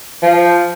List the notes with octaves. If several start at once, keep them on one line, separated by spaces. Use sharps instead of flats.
F3